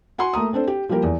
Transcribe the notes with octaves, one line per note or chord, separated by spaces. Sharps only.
F#4 F#5 G#5 C6
A3 A#3 A#5 D#6
C4 D4 A4 C5
G4
F3 G3 A#3 G4 A#4
E2